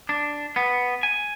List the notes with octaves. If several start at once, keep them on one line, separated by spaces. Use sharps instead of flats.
D4
B3
G#5